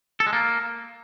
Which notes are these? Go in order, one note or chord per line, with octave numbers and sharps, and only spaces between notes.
A4
G#3
A#3